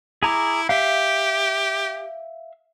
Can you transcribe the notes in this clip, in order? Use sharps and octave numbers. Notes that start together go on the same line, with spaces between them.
E4 G#4 A#5 D6
G4 E5 F5